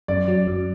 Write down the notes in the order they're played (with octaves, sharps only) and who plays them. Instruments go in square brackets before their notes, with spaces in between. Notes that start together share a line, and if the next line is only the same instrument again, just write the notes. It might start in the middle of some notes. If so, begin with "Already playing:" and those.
[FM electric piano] F#2 [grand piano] D5
[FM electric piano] F#3
F#2